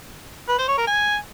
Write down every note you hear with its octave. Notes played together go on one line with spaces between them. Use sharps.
B4
C5
C#5
A#4
G#5